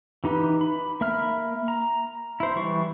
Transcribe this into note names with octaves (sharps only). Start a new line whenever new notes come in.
E3 D#4 G4 B4
B5
A#3 E5 B5 F6
A#5
E4 C5
E3 G3 C#6